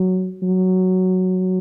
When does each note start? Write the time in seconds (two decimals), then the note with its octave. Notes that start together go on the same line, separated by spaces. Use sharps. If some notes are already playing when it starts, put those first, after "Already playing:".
Already playing: F#3
0.43 F#3